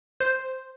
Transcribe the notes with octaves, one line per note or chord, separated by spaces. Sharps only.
C5